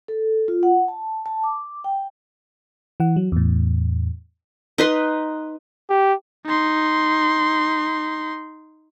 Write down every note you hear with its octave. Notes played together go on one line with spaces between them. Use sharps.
A4
F4
F#5
A5
A5
D6
G5
E3 F#5
F#3
E2 A2
D#4 B4 C6
G4
D#4 C6